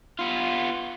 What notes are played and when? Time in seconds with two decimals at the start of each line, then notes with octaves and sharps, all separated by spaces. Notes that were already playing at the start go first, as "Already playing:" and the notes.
0.19 B3 F4